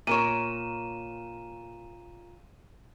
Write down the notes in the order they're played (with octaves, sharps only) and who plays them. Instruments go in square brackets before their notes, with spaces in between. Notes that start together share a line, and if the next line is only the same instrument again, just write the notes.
[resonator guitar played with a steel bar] A#2 A#4 C#5 [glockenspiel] D#7 E7